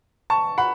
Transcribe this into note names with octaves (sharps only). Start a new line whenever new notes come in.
A5 C#6
F#5 B5